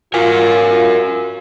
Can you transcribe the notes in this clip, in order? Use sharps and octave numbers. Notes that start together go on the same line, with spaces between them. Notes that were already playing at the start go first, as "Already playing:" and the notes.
F4 F#4 A#4 G#5